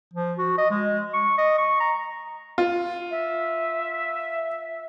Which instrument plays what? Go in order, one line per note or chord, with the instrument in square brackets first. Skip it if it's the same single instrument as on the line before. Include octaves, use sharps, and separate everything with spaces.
[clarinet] F3
F#4
D#5
G#3
C#6
D#5
C#6
A#5
[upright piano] F4
[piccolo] E5